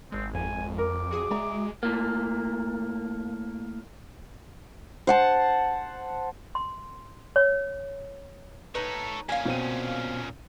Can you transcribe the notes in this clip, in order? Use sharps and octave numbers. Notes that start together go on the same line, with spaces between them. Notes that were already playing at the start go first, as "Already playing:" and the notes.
G#1 G#3 C4
F2 G#5
A#4 D6
F#4 G#4 D#6
G#3 D5 E5 A#5
A2 A#3
C5 F#5 A5
C6
C#5
D#4 A4 B4 C#5
A#2 C#4 F5 G#5
B2 C4 D#7